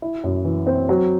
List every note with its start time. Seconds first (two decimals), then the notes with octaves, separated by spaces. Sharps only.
0.02 E4
0.24 F#2
0.45 E3
0.67 C4
0.89 F#3